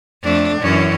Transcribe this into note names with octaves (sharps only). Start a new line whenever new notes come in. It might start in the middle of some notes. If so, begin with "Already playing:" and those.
F2 A3 D4
F#2 E3 C#4